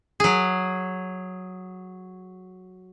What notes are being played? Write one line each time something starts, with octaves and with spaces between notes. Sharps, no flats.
F#3 G#4